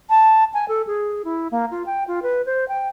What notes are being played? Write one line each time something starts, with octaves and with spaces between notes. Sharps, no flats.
A5
G#5
A4
G#4
E4
A#3
F4
G5
F4
B4
C5
G5